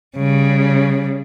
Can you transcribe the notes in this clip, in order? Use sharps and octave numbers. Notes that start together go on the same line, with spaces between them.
C#3 G3